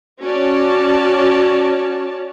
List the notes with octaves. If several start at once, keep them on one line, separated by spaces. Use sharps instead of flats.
C#4 F#4 C#5 D5 A5